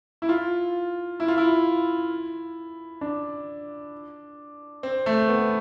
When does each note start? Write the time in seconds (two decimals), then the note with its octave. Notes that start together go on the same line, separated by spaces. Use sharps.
0.22 E4
0.29 F4
1.20 E4
1.28 F4
1.38 E4
3.01 D4
4.83 C4
5.06 A3
5.29 B3